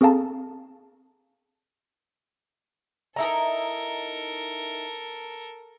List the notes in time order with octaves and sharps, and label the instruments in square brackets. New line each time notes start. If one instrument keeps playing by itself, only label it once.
[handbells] C4 G#4 A4 F5 A5 A#5
[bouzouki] D#4 E4 A#5 [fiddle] A4 A#4